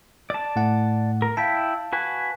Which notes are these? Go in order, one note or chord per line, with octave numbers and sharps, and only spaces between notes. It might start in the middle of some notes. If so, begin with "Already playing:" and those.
D5 A5
A2 A3 F#5
A#4
E4 F5 G5 A5 B5
F#4 B4 G#5